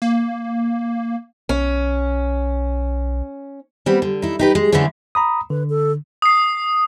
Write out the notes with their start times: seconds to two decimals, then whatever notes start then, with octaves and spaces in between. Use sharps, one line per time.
0.02 A#3
1.49 B1 C#4
3.86 G3 B3 C4
4.02 D3
4.22 D#4 E4
4.39 D#4 G4 B4
4.55 G#3
4.72 D3 E3 G#3 A3 C#4
5.15 A#5 B5 D#6
5.50 D3 B4
5.70 A4
6.22 D#6 C7